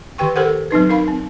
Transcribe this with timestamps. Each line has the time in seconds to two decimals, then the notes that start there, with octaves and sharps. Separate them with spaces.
0.18 D#3 G4 B4 G5 C#6
0.36 G4 A4 A#4 C5 F#5
0.71 F#3 C4 D#4 B4
0.90 D#4 A#4 F5 B5
1.08 C4